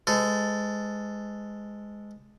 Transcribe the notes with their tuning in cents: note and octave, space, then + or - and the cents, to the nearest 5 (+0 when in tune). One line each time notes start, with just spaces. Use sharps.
G#3 +0 A4 +0 C5 -45